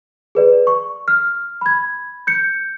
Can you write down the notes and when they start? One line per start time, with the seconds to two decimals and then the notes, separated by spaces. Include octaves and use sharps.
0.35 G#4 B4 D5
0.67 C#6
1.08 F6
1.61 B5 G#6
2.27 G6 C#7